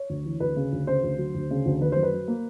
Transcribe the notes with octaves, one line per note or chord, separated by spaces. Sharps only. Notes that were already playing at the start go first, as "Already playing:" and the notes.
Already playing: C#5
D2
E3
D2 B4
C#3
D2
C#3 C5
D2
F#3
D2
C#3
D2
D#3 B4
F#2 C5
B4
F#3
A#3